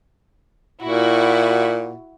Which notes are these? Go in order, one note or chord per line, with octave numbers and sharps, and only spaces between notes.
A#2 E4 F#4